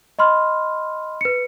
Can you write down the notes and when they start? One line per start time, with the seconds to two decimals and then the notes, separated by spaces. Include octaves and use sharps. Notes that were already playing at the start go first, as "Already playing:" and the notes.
0.19 D#5 B5 C6 F6
1.21 B4 C#7